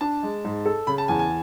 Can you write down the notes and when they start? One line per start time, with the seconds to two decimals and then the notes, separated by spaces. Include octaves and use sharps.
0.01 D4 A5
0.23 G#3
0.44 G#2
0.66 A4
0.87 C#3 B5
0.98 A5
1.08 E2 G#5
1.19 G#5